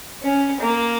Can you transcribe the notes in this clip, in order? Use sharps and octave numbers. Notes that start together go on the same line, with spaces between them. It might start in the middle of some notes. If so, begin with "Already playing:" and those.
C#4
A#3